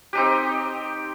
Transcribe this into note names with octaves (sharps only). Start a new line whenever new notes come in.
C4 D#4 G4